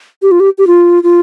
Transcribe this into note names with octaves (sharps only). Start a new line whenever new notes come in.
G4
F4
G4
G4
F4
F4